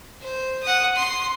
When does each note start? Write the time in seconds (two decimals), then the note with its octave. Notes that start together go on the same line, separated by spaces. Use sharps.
0.21 C5
0.63 F#5 D#6
0.96 C6